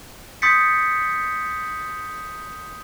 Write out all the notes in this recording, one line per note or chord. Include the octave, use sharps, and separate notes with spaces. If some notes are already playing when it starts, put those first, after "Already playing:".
C6 D#6 G6 A6 B6 C#7